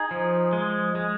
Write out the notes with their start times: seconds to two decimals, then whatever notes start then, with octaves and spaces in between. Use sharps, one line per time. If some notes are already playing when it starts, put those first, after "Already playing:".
Already playing: D#4 G#4
0.11 F3
0.53 G#3
0.95 G#3